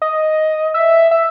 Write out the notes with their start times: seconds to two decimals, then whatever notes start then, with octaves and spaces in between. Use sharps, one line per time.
0.02 D#5
0.74 E5
1.11 E5